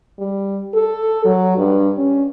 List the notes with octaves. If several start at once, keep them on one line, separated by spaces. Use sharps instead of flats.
G3
A4
F#3
G2
C#4